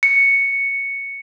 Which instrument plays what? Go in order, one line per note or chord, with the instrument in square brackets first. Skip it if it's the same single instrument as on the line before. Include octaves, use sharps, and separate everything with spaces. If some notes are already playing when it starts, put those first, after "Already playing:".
[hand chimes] C#7